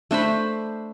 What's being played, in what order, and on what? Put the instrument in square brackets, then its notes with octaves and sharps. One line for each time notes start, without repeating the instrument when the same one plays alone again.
[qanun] A3 D4 C5 B5